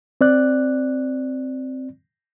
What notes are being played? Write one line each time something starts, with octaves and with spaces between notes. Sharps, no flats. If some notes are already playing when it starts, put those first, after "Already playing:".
C4 D5 F#6